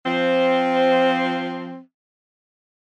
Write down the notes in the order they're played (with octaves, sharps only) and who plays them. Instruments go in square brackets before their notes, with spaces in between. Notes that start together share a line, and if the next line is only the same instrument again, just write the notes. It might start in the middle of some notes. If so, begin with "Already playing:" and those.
[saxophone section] F3 C4